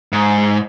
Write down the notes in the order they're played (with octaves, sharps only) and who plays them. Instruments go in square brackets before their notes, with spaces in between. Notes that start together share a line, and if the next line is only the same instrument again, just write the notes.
[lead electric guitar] G#2